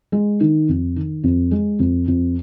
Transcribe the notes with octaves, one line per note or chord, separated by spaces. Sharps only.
G#3
D#3
F2
D#3
F2
G#3
F2
F2